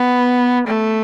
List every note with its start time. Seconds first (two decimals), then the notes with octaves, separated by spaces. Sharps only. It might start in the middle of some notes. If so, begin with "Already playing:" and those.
Already playing: B3
0.68 A3